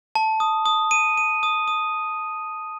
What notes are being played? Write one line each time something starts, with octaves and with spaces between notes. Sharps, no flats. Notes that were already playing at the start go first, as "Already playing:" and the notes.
A5
D#6
D#6
D#7
D#7
D#6
D#6